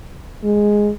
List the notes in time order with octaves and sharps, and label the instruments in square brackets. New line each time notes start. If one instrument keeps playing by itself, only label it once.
[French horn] G#3